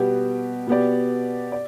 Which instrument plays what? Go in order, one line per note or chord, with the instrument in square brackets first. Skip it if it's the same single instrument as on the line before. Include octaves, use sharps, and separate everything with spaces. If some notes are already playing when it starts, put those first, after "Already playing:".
Already playing: [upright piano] B2 G3 B3 G4
B2 B3 G4 D5
D5